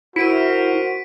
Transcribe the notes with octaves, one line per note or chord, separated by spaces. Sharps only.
D2 E4 F#4 A#4 C5 B6 D7 D#7